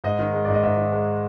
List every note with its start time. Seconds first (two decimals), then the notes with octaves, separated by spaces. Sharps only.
0.04 G#2 D#5
0.19 D#3
0.34 G#3
0.45 G#2 D5
0.54 D#5
0.63 G#2 E5
0.77 D#3
0.92 G#3